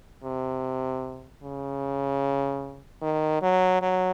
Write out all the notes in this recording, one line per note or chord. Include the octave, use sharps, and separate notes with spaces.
C3
C#3
D#3
F#3
F#3